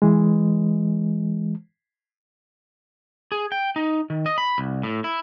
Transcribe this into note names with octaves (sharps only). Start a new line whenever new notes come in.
E3 G#3
G#4
G5
D#4
D#3
D#5
B5
C2
A2
E4